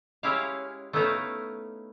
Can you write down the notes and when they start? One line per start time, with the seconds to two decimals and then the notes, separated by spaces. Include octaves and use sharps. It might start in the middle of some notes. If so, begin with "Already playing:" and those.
0.23 G#3 C#4 E4 G4 C#5 F5
0.93 A3 B3 C#4 D#4 E4 F5